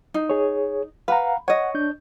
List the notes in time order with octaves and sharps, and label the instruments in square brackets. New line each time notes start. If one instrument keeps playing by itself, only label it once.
[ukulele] D#4
[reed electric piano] G#4 C#5
[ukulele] B4 [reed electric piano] F5 F#5 A#5
[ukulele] C#5 D#5 [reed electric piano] F#5
[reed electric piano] D4 G6